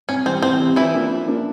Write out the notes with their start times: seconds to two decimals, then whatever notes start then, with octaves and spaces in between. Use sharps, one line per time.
0.09 C2 C#4
0.26 C3 E3 G3 C4
0.42 C2 C4
0.60 C3 E3 G3
0.76 E3 F3 E4
0.93 A#3 D4 F4
1.11 F3
1.28 A#3 D4 F4